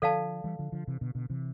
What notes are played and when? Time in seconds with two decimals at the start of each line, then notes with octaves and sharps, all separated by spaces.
0.02 D3 F3 A4 D5 F5 A5
0.44 E3 G3
0.59 D3 F3
0.72 D3 F3
0.87 C3 E3
1.01 B2 D3
1.15 B2 D3
1.30 C3 E3